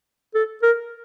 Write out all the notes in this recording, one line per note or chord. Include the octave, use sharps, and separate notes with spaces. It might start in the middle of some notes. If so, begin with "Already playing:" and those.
A4
A#4